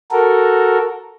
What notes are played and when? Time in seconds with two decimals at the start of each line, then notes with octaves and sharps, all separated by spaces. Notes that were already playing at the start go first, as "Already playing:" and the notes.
0.11 F#4 A4 A#4